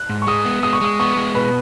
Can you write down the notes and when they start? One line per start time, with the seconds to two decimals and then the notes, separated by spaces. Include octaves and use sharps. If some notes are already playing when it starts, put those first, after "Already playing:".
Already playing: F#6
0.09 G#2
0.22 C#6
0.27 G#3 D#6
0.45 B3
0.63 G#3 D#6
0.73 C#6
0.81 G#3 D#6
1.00 B3 C#6
1.17 G#3
1.35 B2 B4